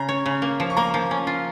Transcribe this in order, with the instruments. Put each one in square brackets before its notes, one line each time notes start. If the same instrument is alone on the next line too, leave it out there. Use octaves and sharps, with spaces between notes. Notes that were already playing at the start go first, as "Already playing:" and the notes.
Already playing: [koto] C#3 [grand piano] A#5
[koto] C#5
C#3
A#3
F3
[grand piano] C#6
[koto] A#3 [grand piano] A#5
[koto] F3
C#4
F4